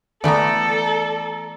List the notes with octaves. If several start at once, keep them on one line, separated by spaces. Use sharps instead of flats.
E3 A3 B3 A4 D5 A#5